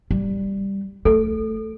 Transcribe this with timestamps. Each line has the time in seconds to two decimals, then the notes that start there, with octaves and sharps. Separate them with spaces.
0.11 G3
1.05 A3 A4